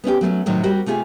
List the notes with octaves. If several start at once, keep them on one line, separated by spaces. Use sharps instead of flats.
B3 C#4 E4 G4
F#3 A3 B3 C#4
A2 C3 D#3 F#3 A3
G3 A#3 C4 F#4 G4
C3 A3 F4 G4 G#4